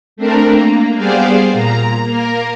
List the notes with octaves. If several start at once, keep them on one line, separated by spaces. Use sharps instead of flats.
A3 C4 D4 A#4
A#3
G3 B3 G#4 C5 D5 F5
A#2 A#5
A#3 A#4